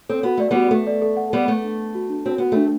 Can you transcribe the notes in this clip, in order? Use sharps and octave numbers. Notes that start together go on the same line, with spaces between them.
C4 A4
B3 F#4
A3 D5
G3 B3 F#4
A3 A4
D5
A4
F#5
G3 B3 F#5
A3 A4
D4
A4
F#4
D4
C4 F#4
B3 F#4
A3 D4